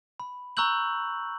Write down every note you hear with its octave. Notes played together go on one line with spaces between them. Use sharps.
B5
A#5 C#6 E6 F#6 G6 F#7